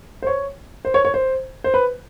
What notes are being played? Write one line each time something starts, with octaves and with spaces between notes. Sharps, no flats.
C5
C#5
C5
C#5
C#5
C5
C5
B4